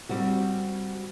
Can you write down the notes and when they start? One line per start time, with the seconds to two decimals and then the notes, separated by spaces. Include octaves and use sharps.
0.09 G3 C4 F#4